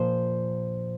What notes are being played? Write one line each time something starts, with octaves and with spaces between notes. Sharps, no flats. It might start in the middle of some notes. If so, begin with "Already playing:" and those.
Already playing: A#2 F3 C5